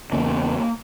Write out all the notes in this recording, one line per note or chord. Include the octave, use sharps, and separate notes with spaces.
E2 C#3 A#3